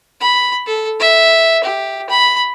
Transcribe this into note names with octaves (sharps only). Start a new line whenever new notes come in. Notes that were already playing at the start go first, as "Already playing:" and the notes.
B5
A4
E5
G4
B5